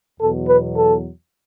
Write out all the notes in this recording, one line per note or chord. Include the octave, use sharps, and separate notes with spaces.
E2 B2 F#3 A4
B4
A4